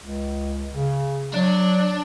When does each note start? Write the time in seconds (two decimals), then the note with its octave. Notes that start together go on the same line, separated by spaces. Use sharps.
0.01 C#2
0.74 C#3
1.34 F#3 D4